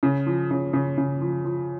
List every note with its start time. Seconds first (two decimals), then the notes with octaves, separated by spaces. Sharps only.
0.03 C#3
0.26 F3
0.51 C#3
0.73 C#3
0.98 C#3
1.21 F3
1.45 F3